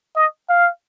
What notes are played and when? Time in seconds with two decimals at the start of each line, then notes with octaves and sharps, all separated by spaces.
0.16 D#5
0.49 F5